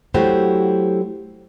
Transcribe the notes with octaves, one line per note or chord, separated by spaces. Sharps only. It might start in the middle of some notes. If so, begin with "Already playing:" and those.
F#3 A3 E4 F#4 G4 C5